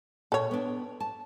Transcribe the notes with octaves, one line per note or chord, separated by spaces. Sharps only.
A#2 A4 C#5
B3 D4
A5